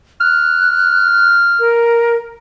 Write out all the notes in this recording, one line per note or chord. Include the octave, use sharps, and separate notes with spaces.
F6 F#6
A#4